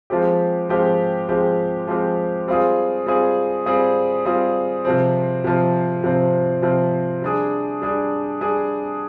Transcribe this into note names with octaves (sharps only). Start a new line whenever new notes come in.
F3 G#3 C4 G4
F3 G#3 C4 G4
F3 G#3 C4 G4
F3 G#3 C4 G4
G3 C4 F4 G#4
G3 C4 F4 G#4
G3 C4 F4 G#4
G3 C4 F4 G#4
C3 F3 C4
C3 F3 C4
C3 F3 C4
C3 F3 C4
G3 D4 G#4
G3 D4 G#4
G3 D4 G#4